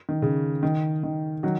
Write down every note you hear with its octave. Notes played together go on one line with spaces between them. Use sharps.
D#3
C#3
D#3
D#3
D#3 F#3